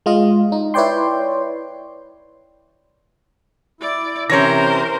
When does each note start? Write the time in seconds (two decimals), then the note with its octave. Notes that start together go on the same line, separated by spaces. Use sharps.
0.06 G#3 F4 D#5
0.52 D#4
0.74 E4 B4 C#5 D5 G5 C6
3.81 E4 D5
4.30 C3 E3 C#4 A#4 C5 C#5 A#6